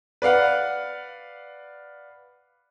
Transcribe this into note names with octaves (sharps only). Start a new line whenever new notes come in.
B4 D5 F5 F#5